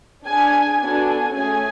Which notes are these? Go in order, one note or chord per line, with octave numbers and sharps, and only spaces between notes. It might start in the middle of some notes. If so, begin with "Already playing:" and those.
D4 G#4 G#5
B3 D4 F#4 A4 G#5
A3 C#4 G#4 G#5